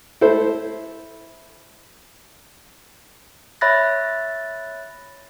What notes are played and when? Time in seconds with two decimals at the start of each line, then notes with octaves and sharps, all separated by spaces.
0.21 E4 A4 C5
3.61 C#5 E5 B5 F#6 A6 A#6